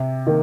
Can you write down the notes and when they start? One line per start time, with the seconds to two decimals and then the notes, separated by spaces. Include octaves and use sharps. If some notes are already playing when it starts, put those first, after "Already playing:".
Already playing: C3
0.27 D#3 A#3